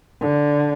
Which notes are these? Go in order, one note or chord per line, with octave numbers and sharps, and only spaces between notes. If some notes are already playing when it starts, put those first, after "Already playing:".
D3